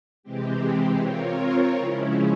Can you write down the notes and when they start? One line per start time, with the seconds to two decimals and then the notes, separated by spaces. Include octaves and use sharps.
0.23 C3 E3 G#3 C4 G4
0.99 C4 F4 A#4 C#5
1.75 C#3 F3 G#3 C#4 E4